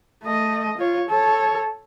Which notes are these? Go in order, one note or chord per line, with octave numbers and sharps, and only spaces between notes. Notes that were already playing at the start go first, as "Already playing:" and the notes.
A3 D#5
F4 C#5
A4 C#5